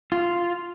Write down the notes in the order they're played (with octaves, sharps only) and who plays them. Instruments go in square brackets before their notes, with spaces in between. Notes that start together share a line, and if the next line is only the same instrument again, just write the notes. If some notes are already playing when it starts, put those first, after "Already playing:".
[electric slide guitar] F4